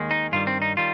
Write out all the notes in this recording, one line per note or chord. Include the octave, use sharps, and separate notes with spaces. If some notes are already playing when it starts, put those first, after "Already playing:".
Already playing: D#2 D#3 G#3
D#4
G2 D#3 G3 F4
C4
D#4
D#3 G3 F4